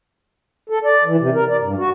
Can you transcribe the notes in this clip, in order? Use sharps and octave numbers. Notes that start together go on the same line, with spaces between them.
A4
D5
E3
C3
A#4
D5
G2
F#4